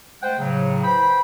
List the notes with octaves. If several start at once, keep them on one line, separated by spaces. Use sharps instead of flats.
G#3 A3 C5 F#5 G5
A2 C#3 F#3
B4 C5 G5 B5